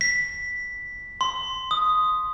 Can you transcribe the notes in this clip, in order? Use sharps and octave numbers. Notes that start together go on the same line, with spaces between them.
B6
C6
D#6